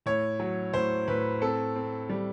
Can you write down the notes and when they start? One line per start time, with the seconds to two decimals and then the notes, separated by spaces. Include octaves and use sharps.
0.06 A2 C#5
0.40 F#3
0.73 A2 C5
1.08 A2 B4
1.41 C4 A4
1.76 C4
2.09 G3